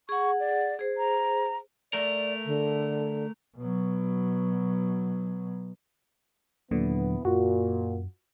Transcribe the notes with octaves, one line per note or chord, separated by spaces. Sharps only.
G#4 F#5 C#6
D5
G#4 C5
A#5
A3 A#4 D5
D3
B2 F#3
D#2 A#2 D3 E3 F#3 B3
F#2 A#2 F4 F#4